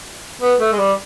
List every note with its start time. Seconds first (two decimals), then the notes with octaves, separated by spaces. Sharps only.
0.42 B3
0.61 A3
0.73 G#3
0.79 G3